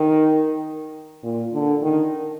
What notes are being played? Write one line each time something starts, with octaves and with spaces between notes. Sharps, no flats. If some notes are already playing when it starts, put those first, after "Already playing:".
Already playing: D#3
A#2
D3
D#3